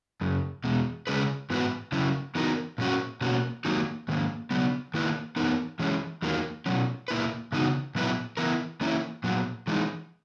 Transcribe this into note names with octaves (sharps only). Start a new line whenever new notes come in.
F#2 C#3
E2 B2 G#3
C#3 G#3 C#4 G#4 B4
G#2 E3 B3 F#4 B4
C#3 F#3 C#4 E4
E3 B3 D#4 F#4 A#4
A#2 F#3 C#4 F#4
B2 A#3 C#4 F#4
D#3 F#3 A#3 D#4
G#2 D#3 A#3
C#3 F#3 B3
D#3 A#3 E4 B4
E3 B3 D#4 A#4
E3 G#3 C#4
E2 D#3 F#3 A#3
B2 F#3 C#4
A#2 A#3 E4 B4
C#3 E3 B3 D#4 F#4
A#2 F#3 B3 E4 B4
E3 B3 E4 A#4
E3 A#3 C#4 E4
A#2 F#3 B3
E3 G#3 D#4